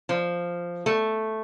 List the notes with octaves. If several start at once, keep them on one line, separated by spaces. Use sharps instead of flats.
F3
A3